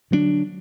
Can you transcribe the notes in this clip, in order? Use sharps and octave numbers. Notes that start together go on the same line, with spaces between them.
D3 F#3 A3 D4